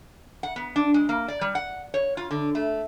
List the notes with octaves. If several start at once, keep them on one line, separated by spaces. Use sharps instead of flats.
F#5
B3
D4
G#3
A#3
D5
G3
F#5
C#5
F4
D3
A3